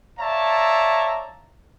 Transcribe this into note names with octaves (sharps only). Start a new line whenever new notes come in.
C#5 D5 E5 F5 A5 A#5